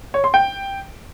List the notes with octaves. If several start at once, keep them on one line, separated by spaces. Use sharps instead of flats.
C#5
C6
G5